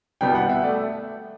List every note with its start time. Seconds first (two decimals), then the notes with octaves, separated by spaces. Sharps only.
0.21 C2 B2 G3 B3 G5
0.35 F#5
0.49 E5
0.63 A3 D5